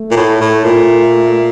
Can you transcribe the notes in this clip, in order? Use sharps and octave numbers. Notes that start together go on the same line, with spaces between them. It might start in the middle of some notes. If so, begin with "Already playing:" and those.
Already playing: A3
A#2
A2
A2
A#2